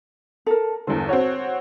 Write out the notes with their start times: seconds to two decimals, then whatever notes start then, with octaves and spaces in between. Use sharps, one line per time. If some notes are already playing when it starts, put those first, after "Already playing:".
0.46 A4 A#4
0.87 E2 G2 D3 C5
1.09 C4 F#4 C#5